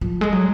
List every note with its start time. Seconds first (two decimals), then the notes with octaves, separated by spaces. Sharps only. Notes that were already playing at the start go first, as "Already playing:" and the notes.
0.01 F3
0.21 G#3
0.32 F#3